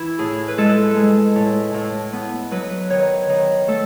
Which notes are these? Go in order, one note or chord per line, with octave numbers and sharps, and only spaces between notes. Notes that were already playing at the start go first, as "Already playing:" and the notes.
Already playing: E3 E4
A2 G#4
B4
G#3 A4
G#3
A2
A2
B3
F#3 B4
D#3 C#5
D#3
A3 A4